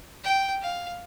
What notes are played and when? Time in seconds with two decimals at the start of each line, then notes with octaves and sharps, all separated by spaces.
0.24 G5
0.62 F5